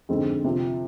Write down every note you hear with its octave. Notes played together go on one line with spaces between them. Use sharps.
F2 D3 G#3 C4 D#4
C3 F3 C4